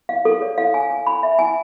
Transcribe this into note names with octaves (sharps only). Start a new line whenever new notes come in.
F5
A4
C#5
F5
G#5
G#5
B5
E5
G#5